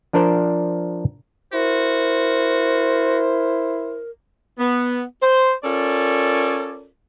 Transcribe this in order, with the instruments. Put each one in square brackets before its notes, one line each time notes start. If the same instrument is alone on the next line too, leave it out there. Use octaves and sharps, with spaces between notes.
[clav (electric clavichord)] F3 D4 A#4 C5 D5
[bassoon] E4 [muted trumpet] F#4 [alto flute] A#4 [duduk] C5
[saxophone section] B3
C5
C#4 F4 A4 A#4 D5